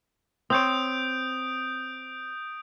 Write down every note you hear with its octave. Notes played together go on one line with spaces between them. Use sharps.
C4 C5 C#5 D#6 G6 D7